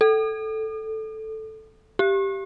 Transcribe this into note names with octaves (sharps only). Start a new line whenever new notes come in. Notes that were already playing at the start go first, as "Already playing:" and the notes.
A4
G4